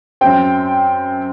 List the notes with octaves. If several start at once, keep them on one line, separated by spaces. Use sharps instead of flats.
F#2 F#3 C4 G5